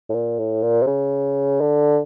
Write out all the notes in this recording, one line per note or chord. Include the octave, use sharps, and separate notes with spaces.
A2
A#2
A2
A#2
C3
C#3
D3